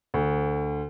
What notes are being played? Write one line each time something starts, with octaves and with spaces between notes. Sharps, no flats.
D2